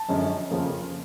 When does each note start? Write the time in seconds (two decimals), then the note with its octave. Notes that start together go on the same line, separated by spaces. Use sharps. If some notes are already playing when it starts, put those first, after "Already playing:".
Already playing: A5
0.08 F#2 D3 F3 G#3 C#4
0.51 F2 C#3 F3 A#3